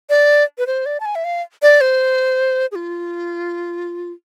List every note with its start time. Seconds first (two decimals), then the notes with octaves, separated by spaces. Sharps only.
0.10 D5
0.58 B4
0.67 C5
0.86 D5
1.00 A5
1.06 G#5
1.15 E5
1.25 F5
1.62 D5
1.81 C5
2.72 G#4
2.75 F4